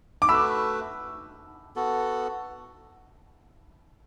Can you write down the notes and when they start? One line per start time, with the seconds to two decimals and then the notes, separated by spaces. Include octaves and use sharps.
0.22 D6
0.28 A3 F#4 B4 B5 E6
1.76 B3 F#4 A4